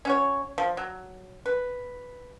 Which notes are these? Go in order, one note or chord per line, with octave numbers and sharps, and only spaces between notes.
C#4 F#4 C#5
F3
F#3
B4